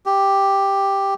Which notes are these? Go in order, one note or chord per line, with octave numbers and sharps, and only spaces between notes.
G4